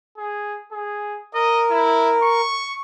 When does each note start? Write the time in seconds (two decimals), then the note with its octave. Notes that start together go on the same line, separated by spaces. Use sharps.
0.18 G#4
0.72 G#4
1.34 A#4 D#5
1.71 E4
2.22 C#6